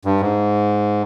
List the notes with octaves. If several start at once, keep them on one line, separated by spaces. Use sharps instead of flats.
G2
G#2